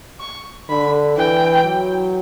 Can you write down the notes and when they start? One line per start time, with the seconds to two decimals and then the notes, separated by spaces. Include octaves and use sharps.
0.20 C#6
0.69 D3 B5
1.17 E3 G5
1.66 F#3